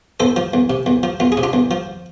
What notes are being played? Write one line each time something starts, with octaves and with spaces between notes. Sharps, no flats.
E2 A4 C5
F3
E2
C3
E2
F3
E2 F4
G#4
C3
D4 F4
E2
F3